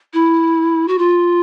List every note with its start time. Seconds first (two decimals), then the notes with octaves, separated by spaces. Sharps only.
0.14 E4
0.88 F#4
0.98 F4